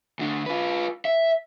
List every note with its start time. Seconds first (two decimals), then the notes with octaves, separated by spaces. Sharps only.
0.19 D2 D3
0.46 F4 B4
1.05 E5